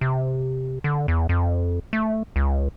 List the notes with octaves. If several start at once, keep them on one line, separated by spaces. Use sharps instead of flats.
C3
D3
E2
F2
A3
C#2